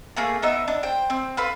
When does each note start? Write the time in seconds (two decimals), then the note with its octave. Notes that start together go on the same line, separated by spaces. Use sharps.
0.17 A3 A#3 G#4
0.42 B3 D#4 E5
0.68 D4
0.83 C5 G5
1.10 C4
1.37 F4 A4 B4 B5